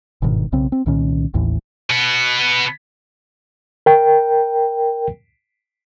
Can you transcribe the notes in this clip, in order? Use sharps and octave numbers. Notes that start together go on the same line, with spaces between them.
G1 G#2 B2 D#3
B1 C#3 C4
C4
C2 A#2 D#3 C#4
A1 D#2 A2 E3
B2 B3
A#4 G5